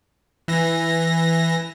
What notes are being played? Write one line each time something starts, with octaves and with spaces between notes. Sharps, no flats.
E3 A#6